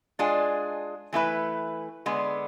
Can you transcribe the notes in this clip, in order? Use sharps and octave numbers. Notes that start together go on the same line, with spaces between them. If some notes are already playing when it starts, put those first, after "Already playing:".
G#3 D4 F4 G#4
E3 A3 E4 B4
D3 G#3 B3